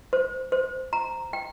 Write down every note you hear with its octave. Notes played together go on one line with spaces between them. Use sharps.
C5
C5
A#5
G5